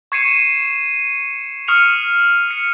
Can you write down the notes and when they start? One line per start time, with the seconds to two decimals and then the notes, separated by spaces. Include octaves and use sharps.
0.12 C#6 G#6 C7 C#7 D#7 E7
1.68 C#6 D#6 F6 C#7 D#7 F7
2.51 C#7